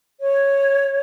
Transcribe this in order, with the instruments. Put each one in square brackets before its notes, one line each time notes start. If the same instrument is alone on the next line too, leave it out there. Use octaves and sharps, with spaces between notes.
[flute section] C#5